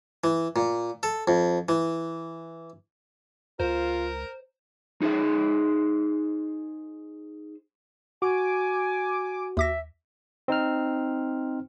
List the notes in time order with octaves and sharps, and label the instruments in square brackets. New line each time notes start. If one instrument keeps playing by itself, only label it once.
[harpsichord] E3
A#2
A4
F2
E3
[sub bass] C#2 [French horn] F4 [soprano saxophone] A#4 [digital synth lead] C5
[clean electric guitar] D#4 G#4 C5 E5
[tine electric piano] F#4 [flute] G#5 [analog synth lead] D6
[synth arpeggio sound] D#2 D6 A#6 [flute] E5
[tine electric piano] C4 D#4 C5 F6